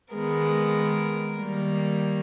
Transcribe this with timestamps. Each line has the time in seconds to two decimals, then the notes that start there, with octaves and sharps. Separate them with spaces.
0.13 D#3 G#3 B3 A#4
1.37 D#3 G3 A#3